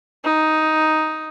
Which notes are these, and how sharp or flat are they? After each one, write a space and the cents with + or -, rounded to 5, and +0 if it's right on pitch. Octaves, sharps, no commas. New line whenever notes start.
D#4 +5